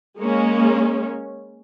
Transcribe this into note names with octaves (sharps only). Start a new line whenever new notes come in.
G#3 A#3 C#4